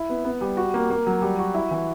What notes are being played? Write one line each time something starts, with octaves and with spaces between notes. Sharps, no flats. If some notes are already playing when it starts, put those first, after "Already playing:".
Already playing: E4
B3
B3
G3
F#4
A#3
A#3
F#3
G3
F#4
E4
E3